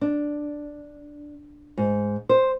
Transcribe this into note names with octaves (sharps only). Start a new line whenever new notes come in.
D4
G#2
C5